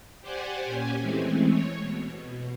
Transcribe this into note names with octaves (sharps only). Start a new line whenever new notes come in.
G4 C5 D5 F#5 G#5
A#2 C#4 G4 G#5
E3 G#3 A3 C4
C#5
B2